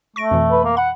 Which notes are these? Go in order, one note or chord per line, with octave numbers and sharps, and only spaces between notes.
A3 C#6 A#6 D7
F2 B2 E3
B4
A#3
F#5 B5